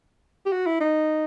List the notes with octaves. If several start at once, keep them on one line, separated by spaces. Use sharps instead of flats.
G4
F#4
E4
D#4